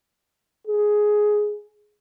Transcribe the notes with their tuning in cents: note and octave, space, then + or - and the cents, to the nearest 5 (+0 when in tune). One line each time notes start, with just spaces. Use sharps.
G#4 +10